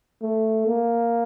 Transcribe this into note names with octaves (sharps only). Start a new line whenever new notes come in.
A3
A#3